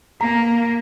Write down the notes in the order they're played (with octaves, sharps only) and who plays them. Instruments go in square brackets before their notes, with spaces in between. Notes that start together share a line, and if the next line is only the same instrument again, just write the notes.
[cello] A#3 [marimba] A#5